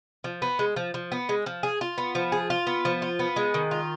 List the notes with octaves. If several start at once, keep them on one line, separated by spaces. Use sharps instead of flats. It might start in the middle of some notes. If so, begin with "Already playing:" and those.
F3
B3
G#3
F3
F3
B3
G#3
F3
G#4
F4
B3
F3
G#4
F4
B3
F3
F4
B3
G#3
D#3
F4